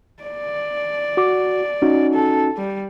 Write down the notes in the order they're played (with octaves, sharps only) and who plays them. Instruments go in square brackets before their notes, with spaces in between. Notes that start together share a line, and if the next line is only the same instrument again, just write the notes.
[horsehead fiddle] D5
[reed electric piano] F#4 D6
C#4 D#4 F#4
[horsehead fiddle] A4
G3